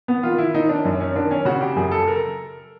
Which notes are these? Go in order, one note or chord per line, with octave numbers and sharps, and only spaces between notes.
B3
D#3 F4
E4
D#3 D#4
D4
F#2 C#4
C#4
D#3 D4
C#4
C#3 F#4
G4
F#2 G#4
A4
A#4